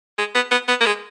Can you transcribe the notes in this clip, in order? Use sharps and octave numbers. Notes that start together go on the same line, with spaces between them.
G#3
B3
B3
B3
A#3
G#3